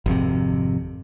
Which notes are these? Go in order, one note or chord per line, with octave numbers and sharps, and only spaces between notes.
G#1 F2 C3